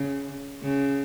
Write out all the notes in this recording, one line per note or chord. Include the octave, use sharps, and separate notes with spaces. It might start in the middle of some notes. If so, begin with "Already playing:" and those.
Already playing: C#3
C#3